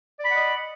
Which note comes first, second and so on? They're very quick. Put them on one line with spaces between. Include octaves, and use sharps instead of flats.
D5 B5 F#5 D#5